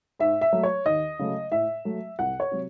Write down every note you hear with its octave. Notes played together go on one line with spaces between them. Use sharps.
G#2 E5
E5
F#3 A3
C#5
D#2 D#5
C#3 F#3 A3
A2 E5
F#3 A3
C2 F#5
C#5
C3 F#3